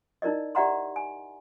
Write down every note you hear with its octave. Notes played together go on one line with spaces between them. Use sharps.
D#4 E4 A#4 D5 D#5
G4 D5 E5 F#5 A#5 C6
G#5